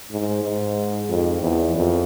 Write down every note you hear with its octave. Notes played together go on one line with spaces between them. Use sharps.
G#2
G#2
F2
E2
F2